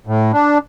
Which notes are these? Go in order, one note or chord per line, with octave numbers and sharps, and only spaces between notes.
A2
D4